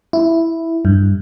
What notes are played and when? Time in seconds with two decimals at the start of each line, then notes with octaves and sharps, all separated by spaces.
0.13 E4
0.85 G2